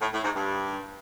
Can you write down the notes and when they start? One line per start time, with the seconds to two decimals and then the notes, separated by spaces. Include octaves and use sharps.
0.02 A2
0.13 A2
0.24 G#2
0.36 G2